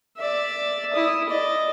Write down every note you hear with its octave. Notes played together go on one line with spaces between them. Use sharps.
D5 E5
E4 D#6
D5 D#5